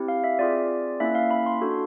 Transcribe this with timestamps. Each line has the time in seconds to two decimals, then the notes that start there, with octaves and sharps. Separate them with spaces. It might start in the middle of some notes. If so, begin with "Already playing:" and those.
Already playing: C4 E4 G4
0.08 F5
0.24 E5
0.39 C4 F4 G#4 D5
1.00 A#3 C#4 E4 E5
1.15 F5
1.31 B5
1.46 C6
1.61 D4 F#4 A4